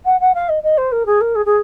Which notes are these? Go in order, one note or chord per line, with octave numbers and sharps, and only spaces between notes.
F#5
F#5
F5
D#5
D#5
C5
A#4
G#4
A#4
G#4
G#4